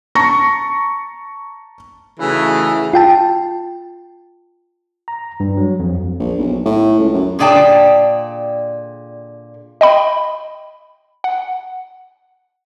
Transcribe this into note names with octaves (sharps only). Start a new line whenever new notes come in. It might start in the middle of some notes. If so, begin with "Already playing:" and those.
A5 A#5 C#6 A#6
C#3 E3 A3 D#4 F#4 G#4
F4 G5 A5
A#5
G2
F#3
F2
A#1
B1
A2
C#2
F#2
A#2 D3 G#4 D5 G5 A5
D#5 G5 B5
F#5